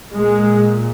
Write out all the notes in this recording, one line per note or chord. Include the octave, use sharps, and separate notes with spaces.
A#2 G#3